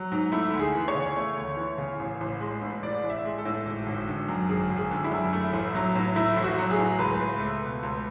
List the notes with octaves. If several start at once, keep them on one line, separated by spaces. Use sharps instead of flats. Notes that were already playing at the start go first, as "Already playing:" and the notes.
Already playing: F#3
G#2
A3 E4
D2
G#4
E3
C#5
C#3
A3
D2
E3
C#3
A1
A1
G#3
A2
A1 D5
A1
E5
G#3
A4
A2
G#1
G#1
D3
F#2
G#1 G#4
G#1
G#4
D3
E4
F#2
A3
A1
F#3
A2
A3 E4
A1
F#4
F#3
G#4
A2
C#2 B4
C#2
A3
B2
C#2